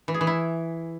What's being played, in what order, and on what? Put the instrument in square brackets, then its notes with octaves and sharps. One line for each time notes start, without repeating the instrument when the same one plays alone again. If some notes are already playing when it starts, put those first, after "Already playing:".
[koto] E3
G#4
E3
E4